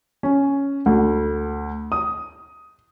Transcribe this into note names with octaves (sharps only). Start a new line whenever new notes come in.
C#4
D2
D#6